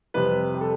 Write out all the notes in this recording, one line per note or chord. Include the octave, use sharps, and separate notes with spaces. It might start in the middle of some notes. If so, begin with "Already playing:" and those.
F2 C3 G3 B4
G4
A4